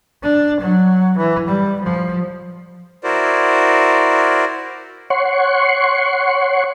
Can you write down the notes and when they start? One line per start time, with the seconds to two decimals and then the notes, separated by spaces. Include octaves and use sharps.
0.22 D4
0.60 F#3
1.17 E3
1.47 G3
1.81 F3
3.03 E4 F#4 A#4 C5 D5
5.10 C#5 F#5 C6 C#6